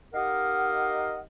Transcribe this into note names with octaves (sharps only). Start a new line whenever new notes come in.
D#4 G4 A#4 D#5 F5 F#5